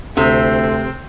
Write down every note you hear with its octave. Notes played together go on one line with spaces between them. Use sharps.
D2 C3 A3 C4